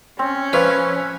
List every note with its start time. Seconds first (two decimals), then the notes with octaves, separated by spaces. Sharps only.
0.19 C4 C#4
0.53 F3 B4 C#5 E5